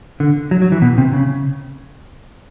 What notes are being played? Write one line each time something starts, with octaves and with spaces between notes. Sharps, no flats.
D3
F#3
F#3
E3
B2
C3
C#3